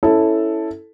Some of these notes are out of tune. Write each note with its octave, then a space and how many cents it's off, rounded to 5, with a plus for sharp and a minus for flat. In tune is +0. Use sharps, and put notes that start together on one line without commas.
C#4 +0 E4 -5 A4 +0